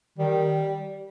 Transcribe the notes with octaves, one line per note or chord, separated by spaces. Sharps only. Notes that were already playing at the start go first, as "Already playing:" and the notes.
D#3 G3